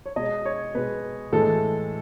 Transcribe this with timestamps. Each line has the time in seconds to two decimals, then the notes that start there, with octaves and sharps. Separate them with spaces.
0.06 C#5
0.16 B2 G#3 D#5
0.45 C#5
0.75 B2 G#3 B4
1.33 A2 E3 G#3 A4